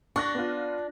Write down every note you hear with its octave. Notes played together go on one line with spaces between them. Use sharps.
D4 C#6 F#6 A#6
B3 F4